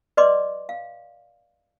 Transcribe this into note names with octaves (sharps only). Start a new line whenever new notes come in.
B4 D5 D#5 C6 D6
F5